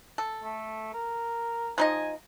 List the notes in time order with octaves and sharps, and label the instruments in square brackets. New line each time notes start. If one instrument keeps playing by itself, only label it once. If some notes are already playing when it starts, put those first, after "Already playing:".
[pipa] A4
[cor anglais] A3
A#4
[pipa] F3 D#4 D#5 [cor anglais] G#5